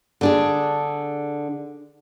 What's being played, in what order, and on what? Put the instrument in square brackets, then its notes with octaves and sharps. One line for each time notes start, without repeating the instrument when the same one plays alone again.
[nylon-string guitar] D3 D4 G#4